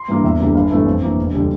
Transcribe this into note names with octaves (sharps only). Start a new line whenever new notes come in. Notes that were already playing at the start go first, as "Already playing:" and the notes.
Already playing: C6
G2 E3 A#3
E2 E5
D3 G3 A#3
G1 F5
G2 E3 A3
F2
E3 A#3
E1
D3 G3